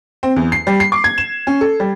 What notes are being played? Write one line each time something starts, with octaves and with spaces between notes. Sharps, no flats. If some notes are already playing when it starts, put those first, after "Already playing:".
C4
E2
C7
G3
C7
D6
G#6
E7
C#4
A4
G3